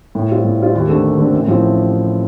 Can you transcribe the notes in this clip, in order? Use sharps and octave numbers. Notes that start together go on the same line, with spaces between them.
A2
G3 C4 F4
A2
G3 C4 F4
D#2
D3 A3 C4
D#2
D3 A3 C4
A1
A2 F3 C4 F4